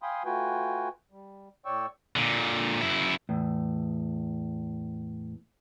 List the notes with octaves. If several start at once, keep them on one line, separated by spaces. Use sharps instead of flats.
F5 G5 G#5 B5 C6 D#6
A3 F4 F#4 B4 G5 G#5
G3
A2 C#5 D5 G5 C#6 E6
A#2 D3
F#2 E4
E2 A2